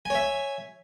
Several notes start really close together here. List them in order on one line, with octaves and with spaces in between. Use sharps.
G#5 C#5 E5